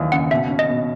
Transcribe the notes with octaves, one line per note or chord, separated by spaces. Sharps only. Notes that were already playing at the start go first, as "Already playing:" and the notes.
Already playing: D#2 E3 F#3
C#3 F#5
B2 E5
C#4
D#5
B2